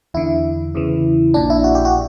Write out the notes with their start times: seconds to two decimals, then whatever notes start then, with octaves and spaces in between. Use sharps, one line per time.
0.14 E2 D3 E4
0.75 E2 C#3 E3
1.34 A#1 A#2 D4
1.50 E4
1.64 F#4
1.75 G4
1.85 F#4